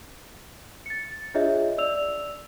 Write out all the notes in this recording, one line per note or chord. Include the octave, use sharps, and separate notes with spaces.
A6 C#7
D4 F4 G#4 C#5 D#5 E5
D5 E6 F7